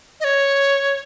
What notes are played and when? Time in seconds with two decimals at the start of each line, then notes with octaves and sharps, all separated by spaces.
0.20 D#5
0.24 C#5